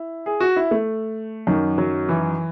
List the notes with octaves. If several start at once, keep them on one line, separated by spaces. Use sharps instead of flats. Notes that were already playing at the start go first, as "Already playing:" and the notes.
Already playing: E4
G#4
F#4
E4
A3
F#2 D#3
F#3
E3